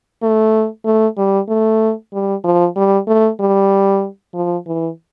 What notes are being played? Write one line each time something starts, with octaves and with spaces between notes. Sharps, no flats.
A3
A3
G3
A3
G3
F3
G3
A3
G3
F3
E3